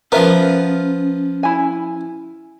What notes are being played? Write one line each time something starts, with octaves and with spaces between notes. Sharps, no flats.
F3 B3 C#4 A#4 B4 E5
E4 G#5